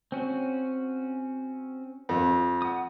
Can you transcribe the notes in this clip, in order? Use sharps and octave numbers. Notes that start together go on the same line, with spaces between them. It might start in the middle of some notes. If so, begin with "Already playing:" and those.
C4 C#4 F#4
F2
F#5 D#6